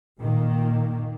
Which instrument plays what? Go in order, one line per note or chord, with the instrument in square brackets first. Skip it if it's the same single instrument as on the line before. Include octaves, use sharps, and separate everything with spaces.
[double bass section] A#2 D#3 A#3